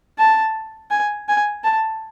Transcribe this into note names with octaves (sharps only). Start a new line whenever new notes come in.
A5
G#5
G#5
A5